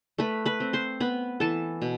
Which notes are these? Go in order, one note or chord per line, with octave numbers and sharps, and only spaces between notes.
A3 B4 B5
B4 B5
C4
C5 C6
B3 B4 B5
E3 A4 A5
B2